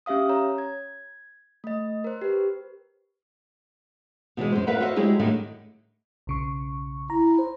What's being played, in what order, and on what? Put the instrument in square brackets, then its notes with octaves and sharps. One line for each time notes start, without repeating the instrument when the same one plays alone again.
[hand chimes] C#4 G4 E5 F5 D#6
C#5 A#5
G#6
A3 D#5
A#4 C5
G4 B4
[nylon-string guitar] B2 E3 F#3 G#3
F#2 C5
F4 A#4 B4 E5 F#5
F4 F#4 A4 C5 D#5 E5
F#3 G#3 E4 G4 G#4 C#5
A2 D3 D#3 G3 A3
[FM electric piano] B1 C#3 C#6
[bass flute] E4 [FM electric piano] A#5
[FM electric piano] C5